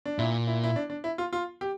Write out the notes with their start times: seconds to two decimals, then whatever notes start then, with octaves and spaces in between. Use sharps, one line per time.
0.06 D4
0.18 A#2 E4
0.47 E4
0.64 E4
0.76 D4
0.90 D4
1.04 E4
1.18 F4
1.33 F4
1.61 G4